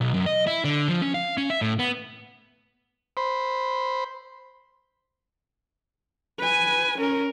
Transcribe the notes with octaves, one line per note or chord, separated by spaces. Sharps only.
B1
F#2
D#5
E4
D3
F3
C#4
F5
C#4
E5
A2
B3
C5 B5
B4 G#5
C#4 A#4